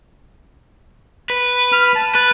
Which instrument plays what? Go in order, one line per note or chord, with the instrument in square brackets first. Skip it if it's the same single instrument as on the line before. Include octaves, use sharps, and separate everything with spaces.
[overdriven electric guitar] B4
[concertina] B5 F6
A5
[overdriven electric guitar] B4 [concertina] F#6